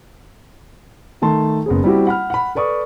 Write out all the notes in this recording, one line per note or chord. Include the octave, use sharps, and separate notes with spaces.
D#3 A3 A5 C6
F#1 B3 G#4
G3 C4 E4 F#4 G4
F#5 B5 F6
F#5 B5
A4 B4 D5 C#6 D#6